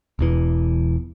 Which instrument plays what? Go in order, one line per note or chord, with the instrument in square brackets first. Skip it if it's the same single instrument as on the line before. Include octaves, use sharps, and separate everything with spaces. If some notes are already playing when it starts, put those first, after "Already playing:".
[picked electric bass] E1 E2 E3